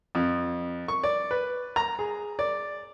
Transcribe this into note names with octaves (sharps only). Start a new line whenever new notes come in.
F2
C#6
D5
B4
A#5
G#4
D5